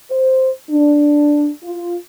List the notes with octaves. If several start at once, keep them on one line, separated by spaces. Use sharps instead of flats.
C5
D4
F4